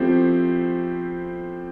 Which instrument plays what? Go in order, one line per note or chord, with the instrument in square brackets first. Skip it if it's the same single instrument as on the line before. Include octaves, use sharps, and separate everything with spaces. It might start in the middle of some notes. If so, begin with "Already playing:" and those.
Already playing: [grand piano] F3 A3 C4 E4 G4